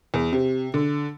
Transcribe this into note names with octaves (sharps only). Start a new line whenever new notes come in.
E2
C3
D3